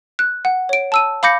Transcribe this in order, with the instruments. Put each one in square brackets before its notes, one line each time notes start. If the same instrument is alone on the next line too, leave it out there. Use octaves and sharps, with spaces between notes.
[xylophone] F#6
F#5
C#5 D7
A5 E6 D#7
F5 B5 D6 G6 A#6 C#7